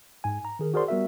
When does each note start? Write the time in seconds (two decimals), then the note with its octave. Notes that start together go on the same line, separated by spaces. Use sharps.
0.24 G#2 G#5
0.45 A#5
0.59 D#3 G#4 A#4
0.74 F#4 G#4 A#4 C5 D5 C6
0.88 G3 B3 F#4 A#4 E5